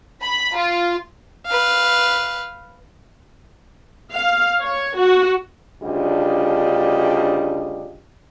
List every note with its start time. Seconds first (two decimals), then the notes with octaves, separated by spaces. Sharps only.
0.22 B5
0.54 F4
1.47 B4 F5
4.12 F5
4.61 C#5
4.97 F#4
5.82 D2 C#3 G3 D4 F4 D#5